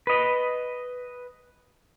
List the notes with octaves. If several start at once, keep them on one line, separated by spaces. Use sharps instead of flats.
B4 D#5